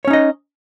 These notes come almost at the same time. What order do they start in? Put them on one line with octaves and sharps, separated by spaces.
C#5 C#4 D#4 D#5